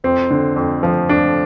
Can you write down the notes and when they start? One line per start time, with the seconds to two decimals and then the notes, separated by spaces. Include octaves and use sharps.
0.04 F2 C4
0.30 D3
0.56 F2
0.83 F3
1.09 F2 D4